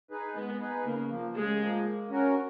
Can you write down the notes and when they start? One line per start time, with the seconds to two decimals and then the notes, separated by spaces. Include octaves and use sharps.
0.10 D#4 G#4 B4
0.35 G#3 B3
0.60 D#4 G#4 B4
0.85 C#3 A#3
1.10 F3 A#3
1.35 C#3 G#3
1.61 F3 A#3
1.85 A#3
2.10 C#4 F#4 A#4